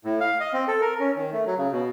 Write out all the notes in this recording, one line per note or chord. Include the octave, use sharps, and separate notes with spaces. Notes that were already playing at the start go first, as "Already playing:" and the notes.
A2
F5
D#5
C4
A4
A#4
C#4
D#3
A3
F#3
C#3
B2